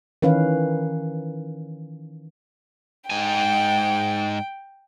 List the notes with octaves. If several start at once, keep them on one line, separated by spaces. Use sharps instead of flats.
D#3 E3 C#4 B4 F5
G#2 G5 G#5